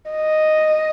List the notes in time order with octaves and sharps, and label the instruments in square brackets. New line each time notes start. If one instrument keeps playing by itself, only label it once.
[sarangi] D#5